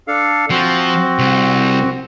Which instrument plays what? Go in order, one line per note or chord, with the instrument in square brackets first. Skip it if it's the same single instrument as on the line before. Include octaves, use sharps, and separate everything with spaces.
[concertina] D4 A4 F5
[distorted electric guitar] F3 [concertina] C4 F#4
[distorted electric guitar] C2